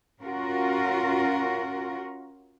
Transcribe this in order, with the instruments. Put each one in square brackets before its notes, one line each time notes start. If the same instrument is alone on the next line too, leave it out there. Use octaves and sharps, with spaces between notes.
[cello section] C#4 F4 F#4 A#4